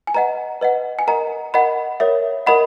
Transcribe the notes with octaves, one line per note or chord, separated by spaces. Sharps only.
G#5
B4 D#5 F#5 A#5
B4 D#5 F#5
G#5
A#4 D#5 F#5 A#5
A#4 D#5 F#5 B5
A#4 C#5 E5
A#4 D#5 F#5 B5